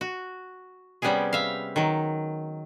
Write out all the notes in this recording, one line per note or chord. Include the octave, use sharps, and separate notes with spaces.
F#4
C3 G3 B3 C#4 G4 G#4
E5 F5
D#3 F#3